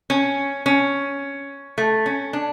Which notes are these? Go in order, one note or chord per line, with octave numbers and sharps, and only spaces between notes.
C#4
C#4
A3
C#4
D4